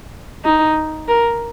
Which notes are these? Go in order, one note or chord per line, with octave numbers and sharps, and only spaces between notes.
D#4
A#4